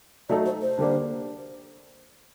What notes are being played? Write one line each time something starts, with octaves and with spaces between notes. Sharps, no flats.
F#3 A3 D#4 A4 D5
C5
C5
D3 G3 A#3 D4